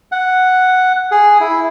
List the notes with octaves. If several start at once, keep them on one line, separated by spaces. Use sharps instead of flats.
F#5
G#4
E4